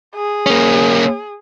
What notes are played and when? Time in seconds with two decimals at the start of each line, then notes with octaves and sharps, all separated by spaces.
0.15 G#4
0.46 A#3 C#4